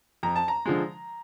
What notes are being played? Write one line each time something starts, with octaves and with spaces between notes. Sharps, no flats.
F2 A#5
A5
A#5
D3 F3 G#3